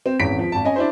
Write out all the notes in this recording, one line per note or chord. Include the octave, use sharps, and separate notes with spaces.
C4
G#1 E2 C#4 B6 D7
F3
G#1 A5
C#4 D#5 G#5
D4 E4 C5